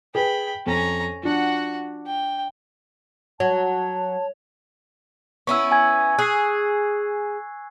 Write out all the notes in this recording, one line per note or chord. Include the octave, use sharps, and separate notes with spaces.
G#4 B4 G5 B5
F2 C#4 A#5
F3 D4 F#4 F#5
G5
F#3 C#5 A5
B3 C#4 E4 C#6 E6
G#5 G#6
G#4 F#6 C7